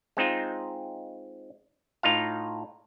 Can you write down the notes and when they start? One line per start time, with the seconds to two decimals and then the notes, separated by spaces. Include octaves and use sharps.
0.17 G#3 C4 D#4 F4
2.03 A2 D#4 F4 F5